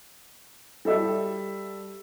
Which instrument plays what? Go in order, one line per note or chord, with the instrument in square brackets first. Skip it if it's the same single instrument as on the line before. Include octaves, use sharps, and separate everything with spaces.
[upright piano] G3 A4 E5 E6